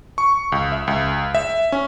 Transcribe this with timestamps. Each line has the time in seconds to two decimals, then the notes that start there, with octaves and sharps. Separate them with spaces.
0.18 C#6
0.52 C#2
0.72 E5
0.87 C#2
1.35 E5
1.72 C#4